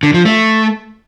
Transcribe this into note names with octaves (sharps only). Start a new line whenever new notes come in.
D3
F3
A3